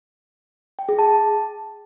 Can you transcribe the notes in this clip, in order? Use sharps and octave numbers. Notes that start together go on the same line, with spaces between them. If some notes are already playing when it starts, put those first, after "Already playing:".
G5
G#4
A5